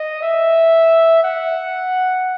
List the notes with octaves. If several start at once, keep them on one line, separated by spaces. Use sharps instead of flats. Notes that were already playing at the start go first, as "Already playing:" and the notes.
Already playing: D#5
E5
F#5